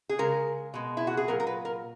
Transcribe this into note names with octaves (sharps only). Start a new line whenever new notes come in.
G#4
C#3 G#3 A#4
B2 G#3
E4
F#4
G#4
A#2 F#3 A#4
A#4
B4
A#4